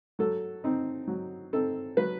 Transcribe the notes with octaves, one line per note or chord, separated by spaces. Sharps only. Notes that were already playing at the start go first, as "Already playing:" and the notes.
F#3 A4
C4 D#4
F#3
C4 D#4 A4
F#3 B4